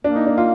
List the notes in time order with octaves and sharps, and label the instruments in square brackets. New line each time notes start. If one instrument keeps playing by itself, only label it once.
[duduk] A#3 [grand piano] D4
[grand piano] D#4
D4
F4